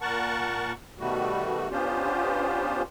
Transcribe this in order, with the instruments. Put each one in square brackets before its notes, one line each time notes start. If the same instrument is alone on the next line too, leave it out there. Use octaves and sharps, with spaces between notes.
[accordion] A#2 A#4 F#5 A5 C#6
B2 D#3 G3 A3 F#4
B3 C#4 D4 F4 G4 C5